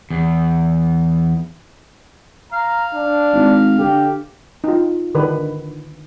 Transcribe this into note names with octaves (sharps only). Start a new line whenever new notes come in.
E2
F5 A#5
D4
G#1
D3 G4
D#4 F4
D3 D#3 B4